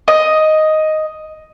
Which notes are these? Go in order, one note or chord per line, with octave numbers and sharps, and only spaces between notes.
D#5